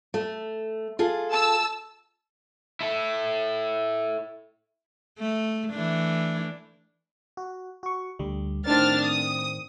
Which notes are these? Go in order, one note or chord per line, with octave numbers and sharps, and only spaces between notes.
A3
F4 G#4 A4
A5 E6
E4 A4
A3
E3 A3 D4
F#4
F#4 C#6
D2 D3 G3
A2 D#3 C4 D4 F6 A6
D#6